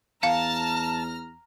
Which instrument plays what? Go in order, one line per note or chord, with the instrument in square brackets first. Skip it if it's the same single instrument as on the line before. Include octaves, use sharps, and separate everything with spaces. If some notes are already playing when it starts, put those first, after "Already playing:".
[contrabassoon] E2 [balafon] F5 [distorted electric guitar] A5 [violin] A#5 F6